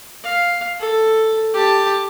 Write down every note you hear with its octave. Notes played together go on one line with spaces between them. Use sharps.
F5
A4
G4 A5